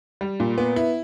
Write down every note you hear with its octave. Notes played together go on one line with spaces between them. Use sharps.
G3
A#2
B3
E4